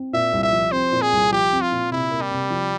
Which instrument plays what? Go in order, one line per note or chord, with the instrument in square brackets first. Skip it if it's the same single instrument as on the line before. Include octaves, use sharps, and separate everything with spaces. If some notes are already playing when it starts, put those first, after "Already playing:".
Already playing: [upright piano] C4
[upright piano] A#2 [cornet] E5
[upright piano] C2
[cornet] E5
[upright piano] F3
[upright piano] C4 [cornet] C5
[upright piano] A#2
[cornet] G#4
[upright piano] C2
[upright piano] F3 [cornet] G4
[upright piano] C4
[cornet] F4
[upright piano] A#2
[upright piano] C3 [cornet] E4
[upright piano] A#3
[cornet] G3
[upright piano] C3
F3